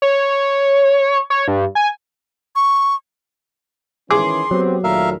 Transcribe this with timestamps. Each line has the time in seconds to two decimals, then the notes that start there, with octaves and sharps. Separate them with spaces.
0.02 C#5
1.30 C#5
1.48 G2
1.75 G#5
2.56 C#6
4.11 D#3 E3 C#4 G#4 C6 D6
4.51 F#3 B3 C4 G4
4.84 D#2 A#2 A3 A#4 E5 F5